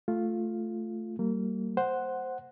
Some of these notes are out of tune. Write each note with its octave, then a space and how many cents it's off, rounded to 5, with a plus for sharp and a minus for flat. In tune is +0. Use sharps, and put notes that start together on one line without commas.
A3 +0 F4 +0
G3 -40 A#3 -30
C5 +0 F#5 +0